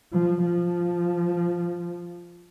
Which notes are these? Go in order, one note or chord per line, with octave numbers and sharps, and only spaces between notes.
F3
F3